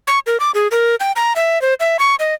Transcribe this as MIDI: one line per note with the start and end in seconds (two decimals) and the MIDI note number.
0.07 0.19 85
0.27 0.37 70
0.40 0.51 86
0.54 0.68 68
0.71 0.95 70
1.00 1.12 79
1.16 1.33 82
1.36 1.61 76
1.62 1.74 72
1.80 1.97 76
1.99 2.15 85
2.19 2.34 75